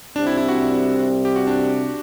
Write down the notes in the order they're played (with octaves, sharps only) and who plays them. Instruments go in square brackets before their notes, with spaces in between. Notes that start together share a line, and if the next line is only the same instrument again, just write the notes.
[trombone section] C2 C3 G3 C4 [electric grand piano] D4
[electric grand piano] E4
E4
F#4
G4
F#4
D4